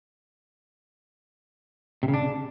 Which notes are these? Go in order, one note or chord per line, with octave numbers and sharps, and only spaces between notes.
C3
C#3
D4